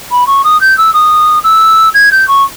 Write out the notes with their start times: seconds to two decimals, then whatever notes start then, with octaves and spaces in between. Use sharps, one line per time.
0.11 B5
0.26 C#6
0.44 D#6
0.61 G6
0.77 E6
0.93 D#6
1.43 E6
1.94 G#6
2.11 G6
2.28 C#6